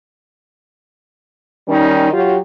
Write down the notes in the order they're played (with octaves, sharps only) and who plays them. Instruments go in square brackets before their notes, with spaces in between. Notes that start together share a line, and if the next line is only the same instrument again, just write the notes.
[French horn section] D#3 G3 C#4 D#4
F#3 F4 G4